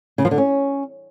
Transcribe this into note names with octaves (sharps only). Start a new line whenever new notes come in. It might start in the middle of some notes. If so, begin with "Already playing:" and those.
C#3
F3
D3
C#4